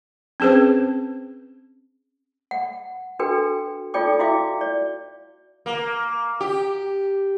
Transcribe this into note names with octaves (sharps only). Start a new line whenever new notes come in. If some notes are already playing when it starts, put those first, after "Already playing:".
C4 C#4 G#4 B4 C5
F#5
D4 F#4 A4 B4 G5
D#4 F4 A4 D5 G5 D6
E4 F#4 E5 F5 G5 D6
D5
A#3
G4